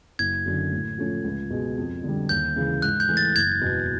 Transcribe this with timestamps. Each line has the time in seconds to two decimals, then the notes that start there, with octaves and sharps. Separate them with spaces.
0.19 F#1 G#6
0.46 F#2 D3
0.72 A2
0.98 F3 A3 C#4
1.24 C#2
1.50 B2 G#3
1.78 F2
2.03 D3 G3
2.29 D#2 G6
2.56 C#3 E3 G#3
2.82 G#2 F#6
3.00 G6
3.09 E3 A3
3.17 A6
3.35 F#1 G#6
3.61 E2 B2